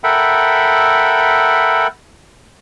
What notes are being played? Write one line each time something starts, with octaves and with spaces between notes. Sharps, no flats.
A4 A#4 E5 F#5 G5 B5